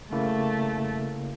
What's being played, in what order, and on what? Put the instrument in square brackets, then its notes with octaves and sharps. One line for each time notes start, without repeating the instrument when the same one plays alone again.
[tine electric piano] C#3 A#3 E4 [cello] A3